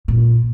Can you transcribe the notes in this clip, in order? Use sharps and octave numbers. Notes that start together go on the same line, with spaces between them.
A#2